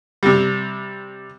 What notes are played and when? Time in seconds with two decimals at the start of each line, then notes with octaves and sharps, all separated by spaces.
0.23 C3 G3